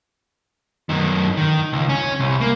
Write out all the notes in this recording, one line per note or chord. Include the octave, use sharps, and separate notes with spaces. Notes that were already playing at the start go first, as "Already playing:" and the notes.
F#2 D#3
D#3
C#2
C#4
C2
A#3